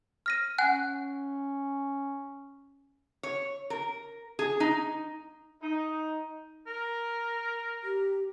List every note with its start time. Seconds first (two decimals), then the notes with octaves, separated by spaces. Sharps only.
0.26 F6 A#6 D#7
0.58 C#4 F#5 G#5 F#6
3.23 C#5
3.70 A#4
4.39 G#4
4.60 D#4
5.62 D#4
6.67 A#4
7.84 G4